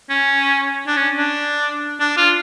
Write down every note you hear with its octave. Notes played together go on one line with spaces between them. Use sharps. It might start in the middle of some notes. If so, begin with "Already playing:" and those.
C#4
D4
C#4
D4
D4
F4